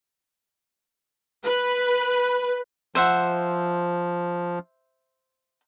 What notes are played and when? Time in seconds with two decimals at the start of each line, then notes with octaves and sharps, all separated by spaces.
1.45 B4
2.95 F3 C5 E5 F#5